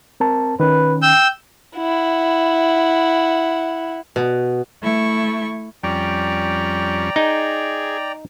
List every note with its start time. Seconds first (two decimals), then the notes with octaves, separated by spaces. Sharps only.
0.20 C4 A#4 A5
0.60 D#3 C#4 B4
1.02 G5 E6 G6
1.77 E4 F#5
4.16 B2
4.82 A3 E4 C#6
5.84 F2 G3 C#4 D5 G5 A#5
7.16 D#4 G#4